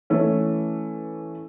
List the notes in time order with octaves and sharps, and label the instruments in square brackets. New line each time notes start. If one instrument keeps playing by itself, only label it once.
[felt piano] E3 A3 C#4